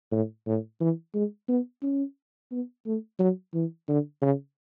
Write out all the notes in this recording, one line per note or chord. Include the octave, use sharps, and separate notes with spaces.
A2
A2
E3
G#3
B3
C#4
B3
A3
F#3
E3
D3
C#3